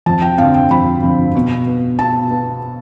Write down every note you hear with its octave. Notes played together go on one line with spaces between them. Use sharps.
F2 A5
G5
D3 F3 C4 F5
G5
F2 B5
D3 F3 C4
B2
B3
B2 A5
B3